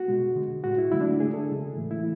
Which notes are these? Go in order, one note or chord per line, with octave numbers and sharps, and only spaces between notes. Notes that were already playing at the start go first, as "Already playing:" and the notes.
Already playing: F#4
B2 G#3
D3 G#3
A2 G#3 F#4
E4
D3 F#3 A3 E4
D4
E4
D3 G#3 G#4
A4
C#3 G#3
A2 E3 A3
E4